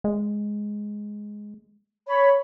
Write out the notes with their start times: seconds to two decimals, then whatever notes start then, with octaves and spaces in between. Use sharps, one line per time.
0.04 G#3
2.07 C#5 B5